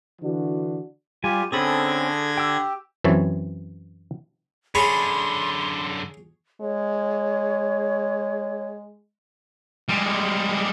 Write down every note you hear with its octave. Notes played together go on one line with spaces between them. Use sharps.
D3 E3 D4 F#4
G3 F4 G4 G#5
D3 C4 C#4 G#4 A4 B5 G#6 A#6
G4 G5 E6
F#2 E3 C4 C#5 A5
F#2 D3 G#4 C#5 G#5 B5 C6
G#3 C#5
G3 G#3